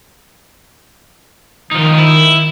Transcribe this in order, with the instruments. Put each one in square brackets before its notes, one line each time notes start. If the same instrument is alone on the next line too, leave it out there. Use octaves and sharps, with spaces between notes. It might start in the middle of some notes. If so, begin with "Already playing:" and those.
[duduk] D#3 [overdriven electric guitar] F3 D#4
[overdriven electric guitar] E4